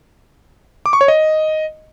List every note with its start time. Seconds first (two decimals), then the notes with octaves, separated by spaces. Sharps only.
0.86 D6
0.93 C#6
1.01 C#5
1.08 D#5